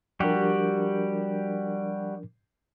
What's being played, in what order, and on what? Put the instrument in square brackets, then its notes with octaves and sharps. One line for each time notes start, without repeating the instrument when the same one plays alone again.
[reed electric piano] F3 D4 A#4 [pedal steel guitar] G3 F#4 G4